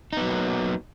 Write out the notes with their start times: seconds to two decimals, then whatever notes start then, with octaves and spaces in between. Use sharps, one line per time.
0.13 D#4
0.17 B3
0.21 F#3
0.26 A#3